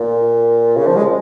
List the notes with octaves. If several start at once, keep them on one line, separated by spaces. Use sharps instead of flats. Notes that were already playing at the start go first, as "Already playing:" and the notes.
Already playing: A#2
C#3
F3
G#3